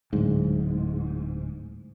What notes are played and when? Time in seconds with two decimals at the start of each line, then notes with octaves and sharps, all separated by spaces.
0.13 D1 G#2